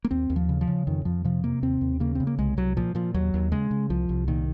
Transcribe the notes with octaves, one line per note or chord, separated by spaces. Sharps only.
A#3
D#2 C4
D#2
F3
C#3
F3
C#3
F2 D#3
F2 F3
C3 F3
C3 A#3
D#2 C4
D#2
C#3 A#3
C#3 C4
A#3
C2 G#3
C2 F#3
A#2 F3
A#2 F3
D#2 F#3
D#2
C#3 G#3
C#3
C2 F3
C2
A#2 D#3